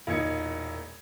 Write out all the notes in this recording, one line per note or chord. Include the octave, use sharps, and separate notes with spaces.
E1 A#2 D#4 G#6 C#7